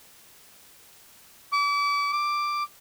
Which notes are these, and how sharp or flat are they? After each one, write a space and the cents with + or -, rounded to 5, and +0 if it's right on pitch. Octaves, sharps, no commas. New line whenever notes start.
D6 -35
D6 +5